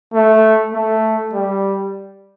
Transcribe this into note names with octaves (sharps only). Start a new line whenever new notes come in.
A3
A3
G3